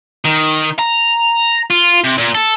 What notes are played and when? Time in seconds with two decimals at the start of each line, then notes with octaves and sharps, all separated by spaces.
0.25 D#3
0.79 A#5
1.70 F4
2.04 C3
2.18 A#2
2.35 A4